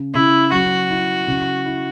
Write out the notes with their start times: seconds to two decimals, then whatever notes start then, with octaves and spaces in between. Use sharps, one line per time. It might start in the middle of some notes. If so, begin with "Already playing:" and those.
Already playing: C#3
0.14 C#3 E4
0.52 F#3 F#4
0.90 E4
1.27 C#3
1.66 E4